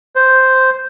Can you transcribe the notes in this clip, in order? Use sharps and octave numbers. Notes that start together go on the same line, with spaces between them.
C5